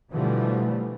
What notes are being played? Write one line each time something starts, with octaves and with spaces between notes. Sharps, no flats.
B2 D3 E3 F3 G3 A3